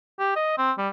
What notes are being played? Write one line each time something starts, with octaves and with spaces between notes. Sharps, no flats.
G4
D#5
C4
G3